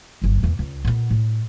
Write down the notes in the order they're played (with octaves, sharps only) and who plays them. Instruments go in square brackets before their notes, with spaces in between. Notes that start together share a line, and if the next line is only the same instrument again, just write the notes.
[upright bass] G1 F#2
E2 A#3
C#2
A#2 B3
A2